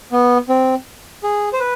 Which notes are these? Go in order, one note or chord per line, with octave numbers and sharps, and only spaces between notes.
B3
C4
G#4
C5
B4